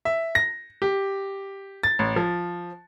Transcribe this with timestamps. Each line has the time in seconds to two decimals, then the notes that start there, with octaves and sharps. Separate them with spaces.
0.05 E5
0.35 A#6
0.82 G4
1.83 A6
1.99 A1
2.16 F3